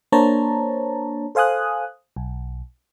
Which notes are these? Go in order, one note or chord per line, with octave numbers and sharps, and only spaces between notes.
A#3 D4 C5 C#5 A5 A#5
A4 C5 F5 G#5 D#6 F#6
B1